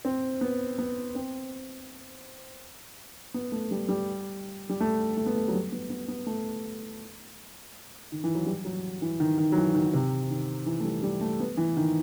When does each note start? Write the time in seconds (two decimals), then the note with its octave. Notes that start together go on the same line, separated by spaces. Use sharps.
0.05 C4
0.41 B3
0.78 B3
1.15 C4
3.34 B3
3.52 A3
3.71 G3
3.89 G3
4.70 G3
4.80 A3
5.17 A3
5.26 B3
5.36 A3
5.48 F#3
5.54 G3
5.72 B3
5.90 B3
6.08 B3
6.26 A3
8.12 D#3
8.24 E3
8.35 F#3
8.47 G3
8.65 F#3
9.02 E3
9.20 D#3
9.38 D#3
9.52 F#3
9.57 E3
9.74 D#3
9.85 D#3
9.93 C3
10.30 D#3
10.66 E3
10.80 A3
10.84 G3
11.03 G3
11.21 A3
11.40 B3
11.57 E3
11.77 D#3